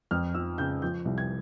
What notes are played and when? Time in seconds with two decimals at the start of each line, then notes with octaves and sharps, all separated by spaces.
0.11 F2 F6
0.34 F3 E6
0.58 C#3 G6
0.82 F3 G6
1.05 C2
1.18 G#6